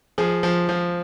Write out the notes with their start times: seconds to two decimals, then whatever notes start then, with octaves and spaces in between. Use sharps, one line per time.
0.18 F3 G#4
0.43 F3
0.69 F3